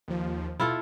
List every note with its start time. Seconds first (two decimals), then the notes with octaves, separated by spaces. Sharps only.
0.08 D#2 F3
0.60 B2 E4 F4 A4